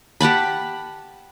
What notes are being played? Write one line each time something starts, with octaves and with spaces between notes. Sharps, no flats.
G4 F#5 A5 B5